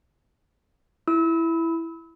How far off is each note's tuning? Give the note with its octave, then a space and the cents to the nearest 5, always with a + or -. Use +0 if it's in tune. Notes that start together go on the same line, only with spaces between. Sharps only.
E4 +5 E6 -35